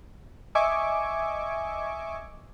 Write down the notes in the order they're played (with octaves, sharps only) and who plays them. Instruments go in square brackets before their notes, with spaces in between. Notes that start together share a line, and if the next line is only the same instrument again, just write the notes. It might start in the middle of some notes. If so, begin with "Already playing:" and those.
[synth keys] D#5 E5 G#5 C#6 D6